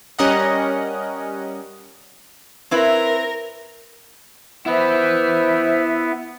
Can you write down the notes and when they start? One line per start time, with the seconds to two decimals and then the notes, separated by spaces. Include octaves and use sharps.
0.19 G3 C#4 A#4 D#5 F#5
2.71 C4 E4 A#4 B4
4.66 B3 E4 B4 C5 E5